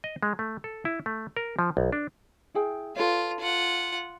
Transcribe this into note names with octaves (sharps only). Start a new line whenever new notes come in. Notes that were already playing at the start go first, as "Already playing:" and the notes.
D#5
G#3
A3
A4
E4
A3
A#4
F3
B1
D4
E4 G#4 G5
F4 A4 B4 C#5
F4 F#5